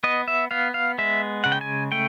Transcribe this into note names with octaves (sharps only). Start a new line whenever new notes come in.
B3 D#5
E5
B3 F5
F5
G#3 E5
C#3 F#5
G5
G#5
A3 G5